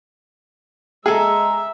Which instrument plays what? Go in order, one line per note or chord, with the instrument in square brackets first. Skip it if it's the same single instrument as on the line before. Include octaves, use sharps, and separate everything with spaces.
[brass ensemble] G#3 A#5 [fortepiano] G#4 A4 [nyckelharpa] E5